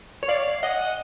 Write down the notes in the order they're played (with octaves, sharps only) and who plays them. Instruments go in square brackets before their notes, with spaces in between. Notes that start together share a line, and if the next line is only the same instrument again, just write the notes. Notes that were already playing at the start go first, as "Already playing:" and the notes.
[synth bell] C#5
[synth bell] D5 [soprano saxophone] F5
[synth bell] D#5 [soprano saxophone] F#5